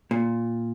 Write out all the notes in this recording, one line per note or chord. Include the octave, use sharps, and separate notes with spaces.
A#2